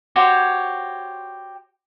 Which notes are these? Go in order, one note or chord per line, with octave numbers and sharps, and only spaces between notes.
F#4 G4 C5 C#5